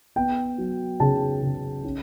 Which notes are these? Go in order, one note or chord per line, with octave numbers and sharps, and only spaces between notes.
B3 G5
F#3
C#3 A5
C#3
C#4